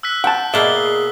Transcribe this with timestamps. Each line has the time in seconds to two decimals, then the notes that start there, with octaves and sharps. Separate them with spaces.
0.03 E6 F#6 B6
0.24 F#5 G5 A5
0.54 B2 A#3 G#4 D5 E5 G7